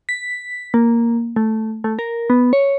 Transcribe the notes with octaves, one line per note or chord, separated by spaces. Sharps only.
B6
A#3
A3
A3
A#4
B3
C#5